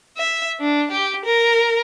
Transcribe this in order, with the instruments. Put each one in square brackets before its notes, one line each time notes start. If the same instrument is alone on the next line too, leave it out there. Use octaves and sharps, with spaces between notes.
[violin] E5
D4
G4
A#4